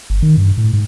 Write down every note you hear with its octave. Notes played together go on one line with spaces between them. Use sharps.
G1
D#3
G2
A2
G#2